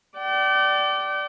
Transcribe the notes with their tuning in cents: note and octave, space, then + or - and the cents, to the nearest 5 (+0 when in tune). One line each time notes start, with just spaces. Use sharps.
D5 +0 G5 -40